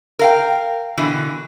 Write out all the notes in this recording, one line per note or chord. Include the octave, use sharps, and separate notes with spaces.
A#4 F5 G5
B2 D3 E3